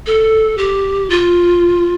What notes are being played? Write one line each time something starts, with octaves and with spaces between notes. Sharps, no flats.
A4
G4
F4